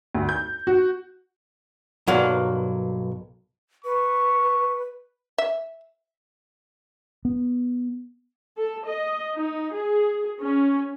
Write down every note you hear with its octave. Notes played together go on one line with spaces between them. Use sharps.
D2
G6
F#4
B1 G2 F#3 A#3
B4 C#6
E5
B3
A4
D#5
D#4
G#4
C#4